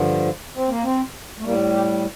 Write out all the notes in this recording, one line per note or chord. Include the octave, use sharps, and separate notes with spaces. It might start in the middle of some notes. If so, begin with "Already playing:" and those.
Already playing: G2 D3 F3
C4
A#3
C4
A3
A2 G3 A#3
G4